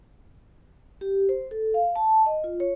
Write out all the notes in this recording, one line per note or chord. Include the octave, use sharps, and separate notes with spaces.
G4
C5
A4
F5
A5
D#5
F4
C#5